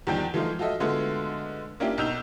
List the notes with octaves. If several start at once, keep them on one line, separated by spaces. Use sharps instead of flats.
E2 D#3 F3 G3 G5 G6
E3 F3 G#3 A3 D#4 F4
F4 F#4 A4 D#5 E5
D3 G#3 A3 B3 F4 F#4
A#3 C#4 D4 E4 F4 G4
B1 D#4 E6 G6 F7